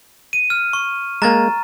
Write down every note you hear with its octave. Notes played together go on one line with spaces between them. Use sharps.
D#7
F6
C#6
G#3 A#3 A#5 A6